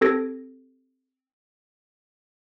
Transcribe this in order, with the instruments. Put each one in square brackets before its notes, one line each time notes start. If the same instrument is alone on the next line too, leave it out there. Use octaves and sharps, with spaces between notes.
[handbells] C4 G4 A4 G#6 A#6 D7